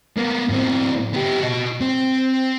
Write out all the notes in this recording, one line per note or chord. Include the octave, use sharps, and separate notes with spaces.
A#3 B3
A2 C4
B3 G4
F#4 D#5
C4 C5